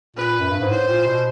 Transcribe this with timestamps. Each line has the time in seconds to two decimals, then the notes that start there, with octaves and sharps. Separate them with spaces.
0.16 A#2 B4
0.40 F#2
0.50 G2
0.61 G#2
0.71 A2 C5
0.88 A#2
1.06 B2